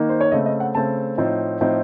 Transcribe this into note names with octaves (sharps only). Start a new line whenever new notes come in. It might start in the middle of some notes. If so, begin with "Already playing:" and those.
Already playing: D#3 A#3 D#4
C5
C#5
C#3 A3 C4 D#5
D#5
F#5
C#3 A3 C4 A5
A2 F3 C4 D#4
A2 F3 C4 D#4